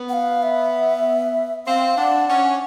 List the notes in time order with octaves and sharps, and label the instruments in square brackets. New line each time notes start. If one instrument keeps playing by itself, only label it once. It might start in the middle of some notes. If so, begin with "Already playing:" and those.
Already playing: [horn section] B3
[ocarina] F#5
F5
E5
[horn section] C4 [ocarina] F5
[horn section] D4 [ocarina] F#5
[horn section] C#4 [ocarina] F#5